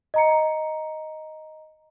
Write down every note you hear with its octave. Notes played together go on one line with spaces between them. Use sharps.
D#5 A#5 C#7